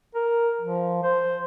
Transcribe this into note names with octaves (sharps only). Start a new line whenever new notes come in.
A#4
F3
C5